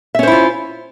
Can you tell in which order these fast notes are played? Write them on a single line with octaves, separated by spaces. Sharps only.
E5 C#4 C5 E4 F4